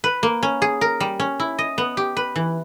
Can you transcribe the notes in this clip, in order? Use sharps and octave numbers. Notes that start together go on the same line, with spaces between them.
B4
A#3
C#4
G#4
A#4
G3
C#4
E4
D#5
B3
G4
B4
E3